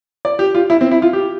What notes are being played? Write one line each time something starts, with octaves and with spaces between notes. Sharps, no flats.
D5
G4
F4
E4
C4
E4
F4
G4